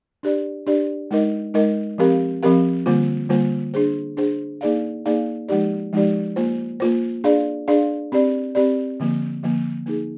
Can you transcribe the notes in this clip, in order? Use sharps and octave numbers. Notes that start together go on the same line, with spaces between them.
D4 G4 D5
D4 G4 D5
G#3 D#4 A#4 D#5
G#3 D#4 A#4 D#5
F3 C4 G4 A#4 F5
F3 C4 G4 A#4 F5
D3 G3 A#3 F4 C5
D3 G3 A#3 F4 C5
D4 G#4 C5
D4 G#4 C5
A#3 D#4 G#4 D5 F5
A#3 D#4 G#4 D5 F5
F3 G#3 D#4 G4 D5
F3 G#3 D#4 G4 D5
A#3 F4 C5
A#3 F4 C5
D4 G#4 D5 F5
D4 G#4 D5 F5
C4 G4 D5
C4 G4 D5
D3 F3 A#3
D3 F3 A#3
A#3 D#4 G#4